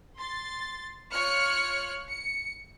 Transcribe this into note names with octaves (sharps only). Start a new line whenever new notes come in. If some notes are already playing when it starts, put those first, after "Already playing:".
C6 A6
F4 C#5 F6 F#6 C#7
C#7